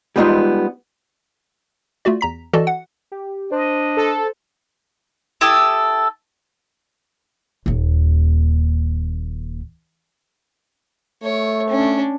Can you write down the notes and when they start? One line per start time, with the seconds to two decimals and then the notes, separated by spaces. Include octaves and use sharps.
0.16 G3 G#3 B3 D4 D#4 F4
2.05 A3 F4 F#4 D5
2.21 E2 A#5 B6
2.53 E3 F#4 A4 D5 D#5 A5
2.67 F#5
3.12 G4
3.52 D4 C5 D#5
3.97 A4
5.41 E4 G4 A4 D#6
7.66 D#1 D#2
11.23 A3 C#5
11.69 C#4 D4